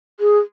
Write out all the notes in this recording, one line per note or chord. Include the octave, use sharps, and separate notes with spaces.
G#4